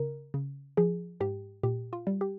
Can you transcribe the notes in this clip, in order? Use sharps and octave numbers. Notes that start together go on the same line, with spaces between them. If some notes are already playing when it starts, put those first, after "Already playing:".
Already playing: C#3 A#4
C#3
F3 G#4
G#2 G4
A#2 G4
F4
G3
G4